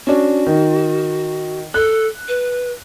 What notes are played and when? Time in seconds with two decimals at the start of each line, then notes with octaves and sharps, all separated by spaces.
0.07 C#4 D4 F#4
0.47 D#3
1.74 A4 F#6
2.28 B4